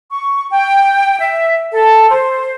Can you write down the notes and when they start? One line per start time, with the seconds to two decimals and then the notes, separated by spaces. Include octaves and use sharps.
0.10 C#6
0.50 G5
1.20 E5
1.71 A4
2.10 C5